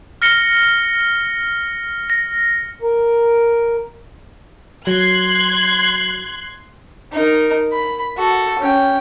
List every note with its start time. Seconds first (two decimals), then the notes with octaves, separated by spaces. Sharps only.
0.22 F6 A#6 C#7 G7
2.10 A#6
2.82 A#4
4.87 F#3 C6 F#6 G#6
7.12 D#4 A#4
7.72 B5
8.17 F#4 A4
8.59 C#4 G5